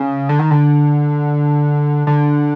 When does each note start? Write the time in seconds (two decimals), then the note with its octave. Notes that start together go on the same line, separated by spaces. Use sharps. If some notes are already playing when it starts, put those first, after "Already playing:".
Already playing: C#3
0.29 D3
0.39 D#3
0.51 D3
2.07 D3